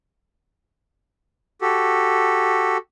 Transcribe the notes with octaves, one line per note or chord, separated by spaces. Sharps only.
F#4 G4 A4